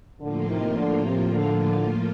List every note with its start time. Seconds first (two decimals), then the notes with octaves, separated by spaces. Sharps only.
0.21 A2 D3 F3 A#3 F4
0.49 C3 D#3
0.77 D3
1.06 C3
1.33 D3